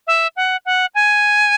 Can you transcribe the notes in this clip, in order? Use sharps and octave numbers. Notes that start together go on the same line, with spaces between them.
E5
F#5
F#5
G#5